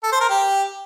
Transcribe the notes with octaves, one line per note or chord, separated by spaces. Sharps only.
A4
C5
A#4
G4